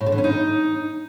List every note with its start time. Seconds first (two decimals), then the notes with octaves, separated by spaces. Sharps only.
0.01 A2
0.06 D3
0.12 E3
0.18 C#4
0.24 D#4